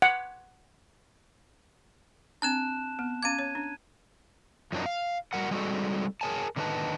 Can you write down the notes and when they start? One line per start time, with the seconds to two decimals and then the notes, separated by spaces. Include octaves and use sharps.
0.02 F#5
2.42 C4 D4 A5 F#6 E7
2.99 B3
3.23 C#4 F5 D6 G#6 D#7
3.39 C#5
3.55 D4
4.72 F#2 F3 F#3 C4 D4 D#4
4.86 F5
5.33 G3 F#4 A#4 F#5
5.51 G3 G#3 C4 D#4 F#4 A4
6.21 G#4 A#4 C#5 G#5 A5
6.56 D3 D#3 C#4 D#4 B4 A5